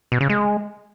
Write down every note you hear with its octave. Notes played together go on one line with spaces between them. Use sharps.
B2
C#3
G#3